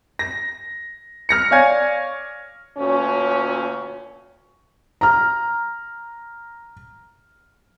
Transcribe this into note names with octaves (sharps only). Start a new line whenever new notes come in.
A#6
F6 A#6 C#7
C#5 D5 F5 G#5 G#6
D2 A#2 C#4
A#5 F6